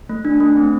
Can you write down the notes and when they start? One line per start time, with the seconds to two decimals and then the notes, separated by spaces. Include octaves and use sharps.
0.09 A3
0.25 D4
0.40 A3
0.57 C4